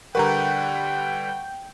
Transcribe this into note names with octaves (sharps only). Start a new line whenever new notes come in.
D3 G3 A#4 B4 F#5 G5 A#5 C#6